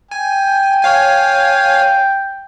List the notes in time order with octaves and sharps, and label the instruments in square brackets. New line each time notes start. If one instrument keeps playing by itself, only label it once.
[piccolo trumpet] G5 [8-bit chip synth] G#5
[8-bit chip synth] C#5 F5 G#5